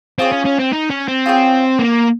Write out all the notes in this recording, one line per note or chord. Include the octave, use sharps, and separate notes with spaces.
C4 F4 G#4 C#5
C#4
C#4
C4
D#4
C#4
C4
F4 G#4 C#5 G5
A#3